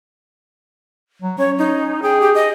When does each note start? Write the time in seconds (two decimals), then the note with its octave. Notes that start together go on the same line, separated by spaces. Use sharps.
1.22 F#3
1.38 C#4 C#5
1.58 D#4
2.03 G#4 G5
2.21 G4
2.35 D#5